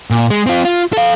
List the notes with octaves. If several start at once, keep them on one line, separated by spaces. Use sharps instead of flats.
A#2
G#3
C4 F4
F4
A4 F5